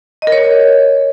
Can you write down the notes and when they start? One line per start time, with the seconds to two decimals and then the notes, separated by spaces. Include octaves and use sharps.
0.22 D#5
0.27 A#4
0.32 C#5